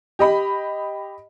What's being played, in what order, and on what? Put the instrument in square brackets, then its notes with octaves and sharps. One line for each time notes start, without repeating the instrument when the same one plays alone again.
[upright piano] G4 D#5 B5